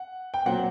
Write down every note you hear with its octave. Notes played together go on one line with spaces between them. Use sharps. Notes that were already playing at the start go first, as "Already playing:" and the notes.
Already playing: F#5
G5
A#2 F#3 C4 F#5